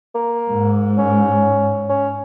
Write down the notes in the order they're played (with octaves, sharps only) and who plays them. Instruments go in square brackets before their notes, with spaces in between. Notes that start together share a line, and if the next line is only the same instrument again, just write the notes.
[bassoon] A#3
[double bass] G#2
[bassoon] C#4
C#4